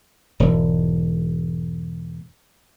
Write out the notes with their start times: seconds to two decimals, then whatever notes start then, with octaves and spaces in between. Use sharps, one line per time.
0.40 E1 G#2